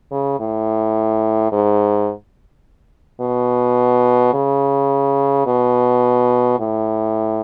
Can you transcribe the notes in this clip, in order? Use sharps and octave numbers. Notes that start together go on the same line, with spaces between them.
C#3
A2
G#2
B2
C#3
B2
A2